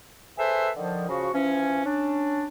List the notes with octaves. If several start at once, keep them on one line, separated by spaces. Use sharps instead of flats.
G#4 A4 B4 C5 E5
D3 D#3 F3
C#3 F3 F#4
E3 F3 C#4
C#4 D4